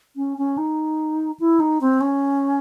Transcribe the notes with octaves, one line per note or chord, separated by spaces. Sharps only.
C#4
C#4
D#4
E4
D#4
C4
C#4